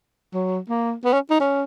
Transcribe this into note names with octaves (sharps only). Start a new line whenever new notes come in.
F#3
A#3
B3
C#4
D#4
C#4